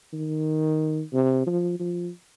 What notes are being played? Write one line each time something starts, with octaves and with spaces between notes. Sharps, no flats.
D#3
C3
F3
F3